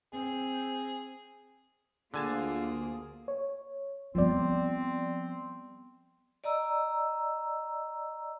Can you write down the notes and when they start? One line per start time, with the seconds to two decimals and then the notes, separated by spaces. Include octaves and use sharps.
0.13 C4 G#4
2.14 D2 D3 A#3 F4 G#4 G#5 A5
3.28 C#5
4.15 F3 G3 B3 C4 D5
6.44 D5 D#5 A#5 E6